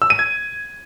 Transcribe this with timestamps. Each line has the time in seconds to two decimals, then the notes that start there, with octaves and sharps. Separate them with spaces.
0.02 E6
0.10 D#7
0.19 G#6